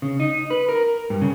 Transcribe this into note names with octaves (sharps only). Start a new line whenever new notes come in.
C#3
D#4
B4
A#4
G2
C#3